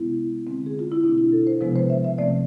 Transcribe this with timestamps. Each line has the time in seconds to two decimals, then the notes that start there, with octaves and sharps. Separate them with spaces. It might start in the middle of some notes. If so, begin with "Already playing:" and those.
Already playing: C3 G#3 B3 E4
0.47 D3 G#3 C4
0.66 G#4
0.79 F4
0.92 E4
1.03 B2 A3 C4 D4
1.18 E4
1.32 A4
1.47 C5
1.61 C3 F3 G#3 B3 B4
1.76 C5
1.90 E5
2.04 E5
2.18 C3 F3 A3 C4 D5